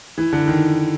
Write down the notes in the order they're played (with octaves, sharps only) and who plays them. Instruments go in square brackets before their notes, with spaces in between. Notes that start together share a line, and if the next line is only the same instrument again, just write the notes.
[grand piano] E3
D3
D#3